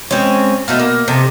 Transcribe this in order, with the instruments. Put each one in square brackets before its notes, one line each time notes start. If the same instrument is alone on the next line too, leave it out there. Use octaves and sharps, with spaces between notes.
[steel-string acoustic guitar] G#3 C#4 [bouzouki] C4 C#5
[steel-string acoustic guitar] B2 [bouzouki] A3 D#4 F4
[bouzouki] A#3
[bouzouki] C3 [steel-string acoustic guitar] A4 D#5